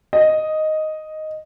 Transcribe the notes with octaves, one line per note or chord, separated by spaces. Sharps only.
D#5